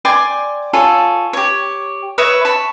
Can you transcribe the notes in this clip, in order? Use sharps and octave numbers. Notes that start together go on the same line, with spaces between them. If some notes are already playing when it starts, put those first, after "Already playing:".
D5 G5 G#5 C6
F4 G#4 A4 C#5
G4 C#5
B4 C#5 E5 D#6
A5 B5 C#6